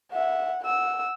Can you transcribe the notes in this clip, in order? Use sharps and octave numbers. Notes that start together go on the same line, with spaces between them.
E5 F#5
F#5 E6